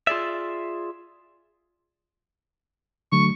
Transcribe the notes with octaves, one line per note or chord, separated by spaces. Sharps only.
F4 G#4 D5 E5
D3 F#3 A3 C#6